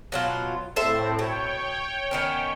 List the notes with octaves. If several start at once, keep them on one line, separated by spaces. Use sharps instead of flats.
B2 F#3 F4
A2 C4 A4 C5 E5
B2 C#5 G5
D#3 B3 C#4